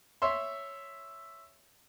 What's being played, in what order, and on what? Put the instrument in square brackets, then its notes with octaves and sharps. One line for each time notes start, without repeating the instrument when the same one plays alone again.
[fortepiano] C#5 E5 C6